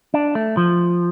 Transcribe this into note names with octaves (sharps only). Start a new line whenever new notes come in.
D4
A3
F3